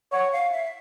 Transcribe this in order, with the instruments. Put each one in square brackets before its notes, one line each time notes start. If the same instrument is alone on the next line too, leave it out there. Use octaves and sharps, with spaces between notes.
[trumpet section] C#5 [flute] F#5
[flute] F5
E5